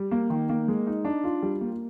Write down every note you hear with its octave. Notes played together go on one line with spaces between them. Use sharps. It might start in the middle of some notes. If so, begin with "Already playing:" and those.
Already playing: G3
A#3
D#3
A#3
G#3
D#4
D4
F4
G3
A#3